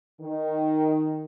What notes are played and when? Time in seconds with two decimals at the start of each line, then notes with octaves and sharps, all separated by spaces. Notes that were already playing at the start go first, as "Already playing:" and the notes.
0.20 D#3